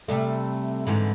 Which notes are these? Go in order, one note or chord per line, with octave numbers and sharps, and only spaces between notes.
C3 G3 A3
G#2 D3 E3